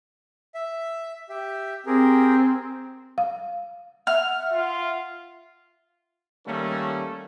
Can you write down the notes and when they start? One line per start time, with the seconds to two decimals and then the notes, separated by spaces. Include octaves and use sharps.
0.55 E5
1.29 G4 E5
1.86 C4 G4 G#4 A#4
3.18 F5
4.07 E5 F#5 F6
4.53 F4
6.46 D#3 G3 A3 A#3 C#4